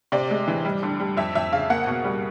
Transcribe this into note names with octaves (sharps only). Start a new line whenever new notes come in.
C3 D5
G#3
E3
G3
D3
G3
F2 E5
F2 E5
C#3 F5
A#3 F#5
B2
G3